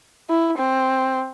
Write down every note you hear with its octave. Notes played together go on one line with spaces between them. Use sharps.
E4
C4